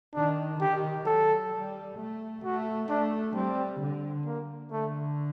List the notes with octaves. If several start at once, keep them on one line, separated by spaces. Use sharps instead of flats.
D#3 D4
D#3 G4
F#3 A4
G3
A3
A3 F#4
A3 D4
G3 C4
D3
A#3
D3 A3